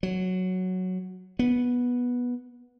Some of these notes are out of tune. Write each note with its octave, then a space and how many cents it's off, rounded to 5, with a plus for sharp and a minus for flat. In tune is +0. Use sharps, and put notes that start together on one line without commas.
F#3 +0
B3 -10